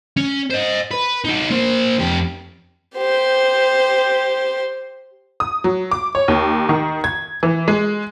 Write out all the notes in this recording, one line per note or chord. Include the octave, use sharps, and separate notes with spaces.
C#4
C5 D#5
B4
D#4 F#4
A#3 C5
F2 G4
G4 C5
D#6
F#3
D6
C#5
D#2
D#3
G#6
E3
G#3